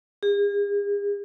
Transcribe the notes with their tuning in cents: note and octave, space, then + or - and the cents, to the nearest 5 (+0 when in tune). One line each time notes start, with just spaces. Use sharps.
G#4 -45